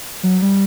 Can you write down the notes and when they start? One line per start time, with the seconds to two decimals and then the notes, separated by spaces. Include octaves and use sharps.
0.23 F#3
0.42 G3